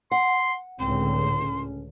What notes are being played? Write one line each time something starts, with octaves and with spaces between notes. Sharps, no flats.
F#5 C6
C#2 A2 D3 C4 C6
C#4